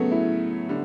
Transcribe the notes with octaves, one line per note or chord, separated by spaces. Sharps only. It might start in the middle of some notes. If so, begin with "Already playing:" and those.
Already playing: C#3 F#3 A3 B3 C#4
E4
D3 G3